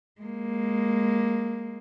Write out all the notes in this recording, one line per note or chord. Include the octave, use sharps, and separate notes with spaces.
G#3 A#3